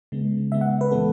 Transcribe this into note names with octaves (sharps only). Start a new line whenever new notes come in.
C#3 G#3 B3
C#3 G#3 B3 E5
F#5
B4
A2 E3 G#3 B3 A4